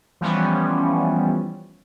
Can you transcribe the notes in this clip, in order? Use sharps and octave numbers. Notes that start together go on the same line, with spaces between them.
E3 F3 G3 B3 C#4